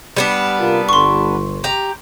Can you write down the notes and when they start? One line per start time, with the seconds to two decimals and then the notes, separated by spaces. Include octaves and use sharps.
0.17 G3 B3 D4
0.59 C3 F4 A#4
0.89 G1 C6 C#6
1.64 G4 A#5